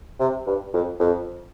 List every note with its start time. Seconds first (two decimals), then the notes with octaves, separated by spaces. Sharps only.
0.20 C3
0.47 G2
0.74 F2
1.00 F2